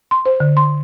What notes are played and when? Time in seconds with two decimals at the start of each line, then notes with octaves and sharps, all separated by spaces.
0.11 C6
0.26 C5
0.40 D3
0.57 C6